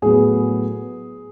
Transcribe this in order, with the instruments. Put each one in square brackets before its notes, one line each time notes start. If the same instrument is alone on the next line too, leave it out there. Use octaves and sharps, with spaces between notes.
[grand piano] A2 F#3 B3 G#4